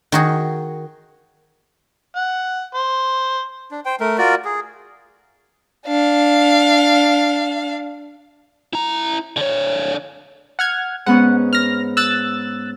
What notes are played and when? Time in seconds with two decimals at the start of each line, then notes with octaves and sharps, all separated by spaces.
0.12 D#3 F#4 G#4
2.16 F#5
2.74 C5
3.71 D4
3.85 C5 G5
4.00 A3 A#4
4.18 F4 F#4 A#4 D5
4.45 G#4
5.86 D4 F5
8.73 E4 A#5
9.37 D3 C#5
10.59 F#5 F6 G#6
11.06 G#2 B3 C#4 F#5
11.53 F6 A#6
11.97 E6 F#6 A6